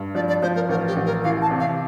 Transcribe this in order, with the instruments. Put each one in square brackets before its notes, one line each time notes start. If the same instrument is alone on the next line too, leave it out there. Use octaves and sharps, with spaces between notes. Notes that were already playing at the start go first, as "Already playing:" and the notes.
Already playing: [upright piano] G2
[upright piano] F3 [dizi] D5
[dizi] D5
[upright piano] F3 [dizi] C5
[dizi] A#4
[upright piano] A1 [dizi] A#4
[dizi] G4
[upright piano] A1
[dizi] A#4
[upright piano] E3 [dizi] F5
[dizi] A5
[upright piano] C3
[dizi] F5